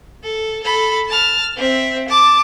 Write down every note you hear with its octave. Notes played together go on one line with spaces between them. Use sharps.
A4
A4 B5
A5 F6
C4 E5
A5 D6